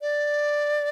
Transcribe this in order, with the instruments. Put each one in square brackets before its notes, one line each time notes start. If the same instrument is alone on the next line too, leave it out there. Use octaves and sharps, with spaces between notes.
[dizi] D5